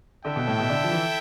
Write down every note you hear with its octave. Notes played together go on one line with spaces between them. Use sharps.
D3 E4 A4 E5 G5
B2
A2
B2
D3
F3
E3